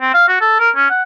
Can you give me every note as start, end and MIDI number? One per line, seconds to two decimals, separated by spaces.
0.01 0.14 60
0.14 0.28 77
0.29 0.38 66
0.41 0.55 69
0.60 0.70 70
0.76 0.88 61
0.90 1.02 78